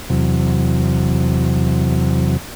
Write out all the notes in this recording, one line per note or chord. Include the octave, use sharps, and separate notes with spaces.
E2 C3 F#3